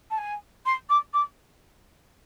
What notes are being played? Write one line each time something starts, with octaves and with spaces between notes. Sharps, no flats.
A5
G#5
C6
D6
D6